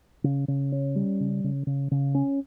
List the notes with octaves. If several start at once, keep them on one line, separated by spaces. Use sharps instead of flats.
C#3
C#3
C#4
G3
C#3
C#3
C#3
C#3
C#4